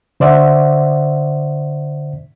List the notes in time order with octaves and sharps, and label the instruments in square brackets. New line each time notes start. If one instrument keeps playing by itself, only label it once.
[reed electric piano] D3 C5 D5 E5 F#5